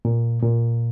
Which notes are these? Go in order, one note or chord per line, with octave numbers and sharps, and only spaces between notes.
A#2
A#2